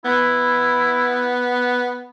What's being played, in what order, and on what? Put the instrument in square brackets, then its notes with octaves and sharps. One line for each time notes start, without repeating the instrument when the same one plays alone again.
[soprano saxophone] B3 [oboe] E4